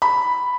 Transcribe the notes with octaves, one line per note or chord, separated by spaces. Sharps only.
B5